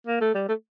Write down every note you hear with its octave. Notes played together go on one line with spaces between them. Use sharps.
A#3
A3
G3
A3